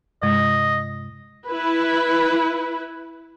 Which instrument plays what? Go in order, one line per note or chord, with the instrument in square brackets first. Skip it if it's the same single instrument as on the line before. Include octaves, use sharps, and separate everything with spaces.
[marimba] G2 C3 G#3 [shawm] D#5
[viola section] E4 B4